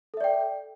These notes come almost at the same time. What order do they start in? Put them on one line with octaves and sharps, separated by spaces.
A4 E5 D5 G5